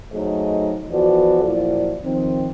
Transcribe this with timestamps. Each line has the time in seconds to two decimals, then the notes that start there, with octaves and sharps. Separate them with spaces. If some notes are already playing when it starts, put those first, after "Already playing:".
0.13 F#3 A3 D#4 G#4 C5 D#5
0.91 E3 F3 B3 F#4 A4 D5
1.43 A#2 F3 F#3 E4 D5
2.04 D#3 F3 C4